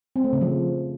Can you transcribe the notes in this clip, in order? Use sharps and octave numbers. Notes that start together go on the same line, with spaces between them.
C4
A3
C#3
F3